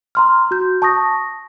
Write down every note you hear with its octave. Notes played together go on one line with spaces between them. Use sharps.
A#5 C6 F6
F#4 G6
A5 C#6 D#6 A#6